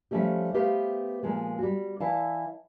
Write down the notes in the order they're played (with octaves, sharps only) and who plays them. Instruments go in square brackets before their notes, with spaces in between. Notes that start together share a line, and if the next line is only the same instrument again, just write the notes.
[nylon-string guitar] F3 G3 A3 C#4 G4
A3 B3 G4 B4 C5 F5
A#2 F3 G#3 B3
G3 F#4
E3 E4 D5 F5 F#5 A5